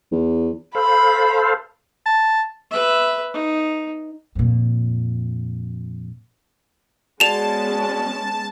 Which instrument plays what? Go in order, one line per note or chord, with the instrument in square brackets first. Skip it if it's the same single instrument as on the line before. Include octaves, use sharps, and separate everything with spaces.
[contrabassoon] E2
[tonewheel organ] A4 C5 F5 [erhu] B5
[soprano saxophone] A5
[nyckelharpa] B4 E5
D#4
[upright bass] F2 A#2
[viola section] G#3 B3 C#4 [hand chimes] F#4 D5 [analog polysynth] A5 [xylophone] E7 F7